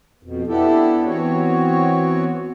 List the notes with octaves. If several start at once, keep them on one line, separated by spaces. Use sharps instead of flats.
F2 B2
B3 D4 E4 G4 A4
E3 B3 C4 F#4 C#5